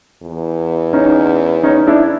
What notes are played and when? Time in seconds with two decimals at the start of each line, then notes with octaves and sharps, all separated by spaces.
0.22 E2
0.93 C#4 D#4
1.63 C#4 D#4
1.87 D4 E4